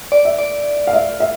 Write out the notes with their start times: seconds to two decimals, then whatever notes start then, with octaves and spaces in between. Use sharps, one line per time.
0.12 D5
0.25 E5
0.38 D5
0.87 F5
0.93 E5
1.20 E5